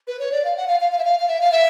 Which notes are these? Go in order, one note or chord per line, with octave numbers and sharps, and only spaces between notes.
B4
C#5
D5
F5
F#5
F5
F5
F5
E5
F5
F5
E5
F5
E5